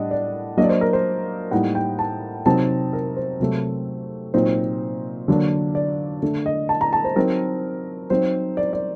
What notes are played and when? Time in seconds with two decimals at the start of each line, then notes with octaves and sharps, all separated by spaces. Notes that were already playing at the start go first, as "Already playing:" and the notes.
Already playing: A2 G3 D4 D#5 F#5
0.11 D5
0.57 F#3 A#3 D4 D#5
0.64 D5
0.69 C5
0.81 A#4
0.93 C5
1.51 A2 G3 A#3 D#4 F#5
1.75 G5
1.99 A5
2.46 C3 F#3 C4 D#4 A5
2.93 A#4
3.17 C5
3.40 C3 F#3 A3
4.34 A#2 F#3 C4 D#4 C5
5.28 D3 F#3 A#3 D4
5.75 D5
6.22 D3 A3 D4
6.46 D#5
6.69 A5
6.81 A#5
6.93 A5
7.04 C5
7.16 F#3 C4 D#4 A#4
8.10 F#3 C4 D#4 C5
8.57 D5
8.73 D5